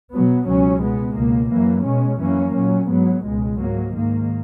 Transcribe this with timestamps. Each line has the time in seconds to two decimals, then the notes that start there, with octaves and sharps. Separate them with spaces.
0.12 B2 F#3 B3
0.46 C#2 B2 F#3 C#4
0.81 B2 G#3 B3
1.16 C#2 B2 A#3
1.50 F#2 E3 A#3
1.84 B2 G#3 C#4
2.20 F#2 E3 A#3 C#4
2.54 A#2 F#3 C#4
2.89 G#2 F#3 B3
3.23 C#2 B2 G#3
3.58 G#2 F#3 A#3
3.93 G#2 D#3 A#3